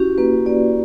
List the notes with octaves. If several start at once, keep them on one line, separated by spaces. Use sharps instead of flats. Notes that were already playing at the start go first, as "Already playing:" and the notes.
Already playing: C#4 E4 F#4 G4
A#3 B4
A#3 D5